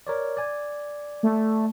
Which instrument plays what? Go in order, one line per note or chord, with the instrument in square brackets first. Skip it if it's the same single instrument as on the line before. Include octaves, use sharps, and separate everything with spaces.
[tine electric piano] A#4 C#5 D5
D5 G#5
[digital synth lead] A3